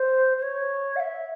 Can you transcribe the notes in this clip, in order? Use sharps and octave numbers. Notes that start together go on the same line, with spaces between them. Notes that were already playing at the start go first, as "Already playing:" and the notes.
Already playing: C5
C5
C#5
F#5
E5